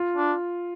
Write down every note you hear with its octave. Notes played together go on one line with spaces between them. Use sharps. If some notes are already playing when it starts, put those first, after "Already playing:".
Already playing: F4
D4